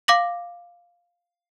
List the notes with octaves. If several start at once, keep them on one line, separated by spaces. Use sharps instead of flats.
F5 D6 A#6 F#7